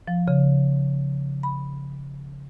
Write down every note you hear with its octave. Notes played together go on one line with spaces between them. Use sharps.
F3
C#3
B5